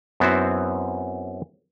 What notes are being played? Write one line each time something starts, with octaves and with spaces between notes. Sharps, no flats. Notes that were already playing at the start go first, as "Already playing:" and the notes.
F#2 B3 C4 E4 F#4 C5